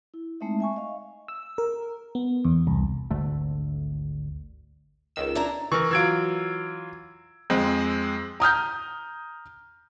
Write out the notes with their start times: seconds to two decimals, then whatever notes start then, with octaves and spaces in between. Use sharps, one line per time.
0.14 E4
0.41 G#3 A3 C4 D#4 E5
0.60 E5 G#5 C#6
0.76 D#5 F5
1.28 E6
1.58 A#4
2.15 B3
2.45 E2
2.67 C2
3.11 G#1 D2 D3 A3
5.16 C#2 D#3 E6
5.35 D4 E4 A#4 A#5
5.72 E3 A#4 C#6
5.91 E3 F#3 F4 E6 G#6 D7
7.50 F2 G#3 C4
8.40 A#5 D#6 F6 G6